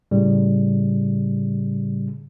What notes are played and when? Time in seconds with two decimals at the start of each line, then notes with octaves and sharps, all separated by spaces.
0.11 A2 C#3 G3